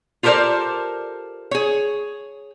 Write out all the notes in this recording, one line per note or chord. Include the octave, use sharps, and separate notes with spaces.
F4 G4 A4 A#4 C5 D5
G#4 C#5